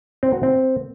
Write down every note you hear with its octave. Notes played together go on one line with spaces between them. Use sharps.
C4
F#4
C4